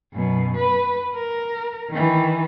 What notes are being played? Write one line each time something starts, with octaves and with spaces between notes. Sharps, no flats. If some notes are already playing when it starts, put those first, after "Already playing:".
F#2 B2
B4
A#4
D#3 E3